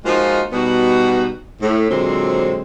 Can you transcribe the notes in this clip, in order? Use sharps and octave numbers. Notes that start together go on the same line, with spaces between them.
F3 G#3 A#3 D#4 F4 F#4
B2 G3 B3 D#4 F#4
A2
A#2 D3 F#3 G#3 C4